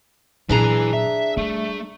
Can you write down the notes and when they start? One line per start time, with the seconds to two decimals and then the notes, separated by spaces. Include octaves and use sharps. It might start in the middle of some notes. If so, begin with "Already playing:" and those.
0.49 A#2 E3 F#3 D4 G#4 A#5
0.93 E5
1.37 G3 A3